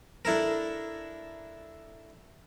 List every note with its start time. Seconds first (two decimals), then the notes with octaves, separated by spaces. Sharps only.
0.25 D4 E4 A4 A#4